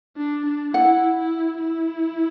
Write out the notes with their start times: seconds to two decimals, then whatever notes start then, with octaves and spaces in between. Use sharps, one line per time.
0.17 D4
0.46 D4
0.74 E4 F#5
1.16 E4
1.59 E4